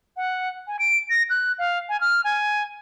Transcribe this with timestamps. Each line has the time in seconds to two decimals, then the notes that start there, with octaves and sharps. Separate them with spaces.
0.17 F#5
0.67 G#5
0.79 D7
1.10 A#6
1.30 F#6
1.59 F5
1.89 G#5
2.01 F6
2.24 G#5